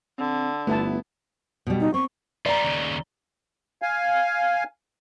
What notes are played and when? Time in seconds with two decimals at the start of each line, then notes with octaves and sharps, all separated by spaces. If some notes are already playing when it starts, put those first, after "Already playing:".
0.19 D3 C4
0.67 G1 A3 B3 E4 A5
1.67 B2 G3
1.80 D#4
1.94 C4 C#6
2.46 G3 F4 D5 A#5
2.64 D#2 C#3
3.82 F5 G#5